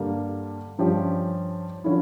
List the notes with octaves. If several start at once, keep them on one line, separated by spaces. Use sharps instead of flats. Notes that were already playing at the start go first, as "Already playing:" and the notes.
Already playing: G2 D3 G3 A#3
G2 F3 C#4 G4
D3 F3 C#4 E4